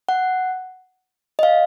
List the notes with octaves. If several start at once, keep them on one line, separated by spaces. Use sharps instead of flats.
F#5
D#5
F5